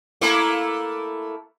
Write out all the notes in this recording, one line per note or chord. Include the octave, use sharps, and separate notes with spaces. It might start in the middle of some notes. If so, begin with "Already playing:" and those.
A3 A#3 E4